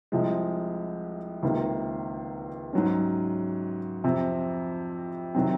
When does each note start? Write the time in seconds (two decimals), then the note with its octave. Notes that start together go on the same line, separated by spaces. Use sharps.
0.12 C2 C3 F3 G#3
1.43 C#2 C3 D#3 A#3
2.73 G#2 F#3 C#4
4.04 F2 C3 F3 C4
5.35 C3 D#3 F#3 C4